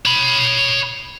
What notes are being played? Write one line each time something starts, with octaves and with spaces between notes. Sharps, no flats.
C#5 B5